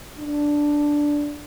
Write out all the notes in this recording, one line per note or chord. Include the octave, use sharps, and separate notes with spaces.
D4